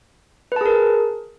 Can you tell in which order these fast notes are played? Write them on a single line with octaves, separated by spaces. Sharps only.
B4 A5 G#4 A#4